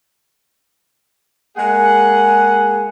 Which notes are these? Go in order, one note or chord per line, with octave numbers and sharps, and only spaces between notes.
G#3 A#3 G#4 F#5